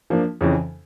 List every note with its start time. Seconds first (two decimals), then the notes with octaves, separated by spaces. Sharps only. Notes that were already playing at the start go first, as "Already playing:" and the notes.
0.10 F3 A#3 D4
0.41 F2 C#3 E3